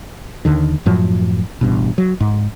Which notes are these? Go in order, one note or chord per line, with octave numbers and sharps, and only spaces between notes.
D#2 D3 D#3
F#2 A2 F3 F#3
A1 G2 B2
F#3
G#2